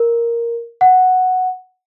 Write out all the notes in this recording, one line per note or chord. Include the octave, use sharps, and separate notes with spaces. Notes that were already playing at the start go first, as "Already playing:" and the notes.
Already playing: A#4
F#5